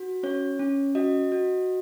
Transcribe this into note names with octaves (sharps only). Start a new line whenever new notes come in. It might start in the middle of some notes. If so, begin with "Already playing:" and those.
Already playing: F#4
C#4 C#5
C#4
F#4 D#5
F#4